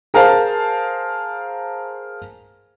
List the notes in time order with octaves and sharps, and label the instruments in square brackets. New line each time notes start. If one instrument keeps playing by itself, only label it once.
[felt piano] G#4 A#4 C5 F5 A5